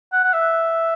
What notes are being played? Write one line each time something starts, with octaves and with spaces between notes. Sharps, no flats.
F#5
F#5
E5